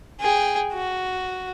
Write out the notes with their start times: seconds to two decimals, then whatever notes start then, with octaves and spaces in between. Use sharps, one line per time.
0.21 G#4 G5
0.73 F#4